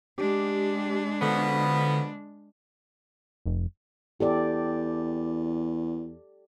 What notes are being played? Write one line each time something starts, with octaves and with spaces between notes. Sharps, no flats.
G#3 D4 G4
B2 D3 F3 B3
F1
E2 G4 A4 D5